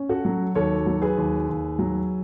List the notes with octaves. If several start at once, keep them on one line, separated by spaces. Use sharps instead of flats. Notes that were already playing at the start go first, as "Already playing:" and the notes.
Already playing: C#4
F#4 A4
F#3
D#2 A4 C#5
F#3
G#4 B4
D#2
D#2
F#3